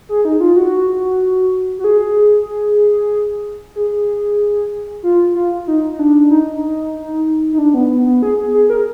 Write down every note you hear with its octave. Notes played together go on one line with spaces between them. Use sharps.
G#4
D#4
F4
F#4
F#4
G#4
G#4
F4
F4
D#4
D#4
D4
D#4
D#4
D4
B3
B3
B3
G#4
G#4
G#4
A#4